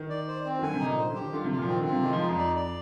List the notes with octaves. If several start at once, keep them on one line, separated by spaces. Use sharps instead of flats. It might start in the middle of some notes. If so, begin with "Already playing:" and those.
Already playing: D#3
D5
C5
C4
D#3
D3 G#5
C3
D#4
A#2
D3 C5
D3
G4
D#3
D3 F4
C3
F4
A#2
F3
D#3 C4
D3
F4
C3
D#3 G#3
F3
D#4
F2
D5
D5